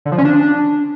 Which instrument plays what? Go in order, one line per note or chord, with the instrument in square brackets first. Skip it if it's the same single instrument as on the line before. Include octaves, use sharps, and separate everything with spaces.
[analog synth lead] D3
F3
C#4
D4